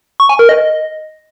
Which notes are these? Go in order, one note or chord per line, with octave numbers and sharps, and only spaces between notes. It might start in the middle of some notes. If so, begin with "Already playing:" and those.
C#6
G#5
A#4
D#5